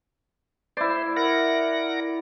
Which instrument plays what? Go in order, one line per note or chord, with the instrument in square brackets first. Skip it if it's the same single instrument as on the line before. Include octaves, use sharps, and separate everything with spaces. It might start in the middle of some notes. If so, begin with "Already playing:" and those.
[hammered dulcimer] E4 D5 [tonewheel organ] C5
[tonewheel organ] A#4 F#5 A#6